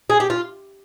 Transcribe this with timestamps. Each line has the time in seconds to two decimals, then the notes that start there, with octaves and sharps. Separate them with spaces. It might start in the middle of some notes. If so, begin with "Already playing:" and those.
0.10 G#4
0.20 G4
0.30 F4